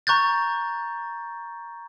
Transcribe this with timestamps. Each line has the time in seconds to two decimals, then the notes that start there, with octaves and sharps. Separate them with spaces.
0.07 A#5 C#6 F#6 G6 A6